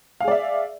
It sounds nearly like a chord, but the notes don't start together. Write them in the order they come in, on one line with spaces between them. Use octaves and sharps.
F5 G#4 D5 E5